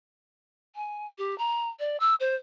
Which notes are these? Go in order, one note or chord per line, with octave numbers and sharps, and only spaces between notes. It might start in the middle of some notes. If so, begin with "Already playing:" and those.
G#5
G4
A#5
D5
E6
C5